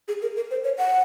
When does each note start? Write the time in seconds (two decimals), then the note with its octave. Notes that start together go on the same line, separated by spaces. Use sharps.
0.08 G#4
0.22 A#4
0.36 A#4
0.51 C5
0.64 C#5
0.78 F#5